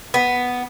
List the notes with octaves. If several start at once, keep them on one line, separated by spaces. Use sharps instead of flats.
B3